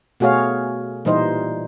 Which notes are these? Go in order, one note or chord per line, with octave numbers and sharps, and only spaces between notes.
B2 A3 F#4 G#4 C#5 F5
A#2 E3 G3 D#4 C5 D#5